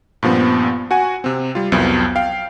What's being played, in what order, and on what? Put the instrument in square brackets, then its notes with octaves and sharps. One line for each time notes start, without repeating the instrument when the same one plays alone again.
[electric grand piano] G2 A#2 F3 B3 C4
F#4 F#5 G#5
C3 C4
G3 F4
C2 F2 F3 F#3 B3
F5 G5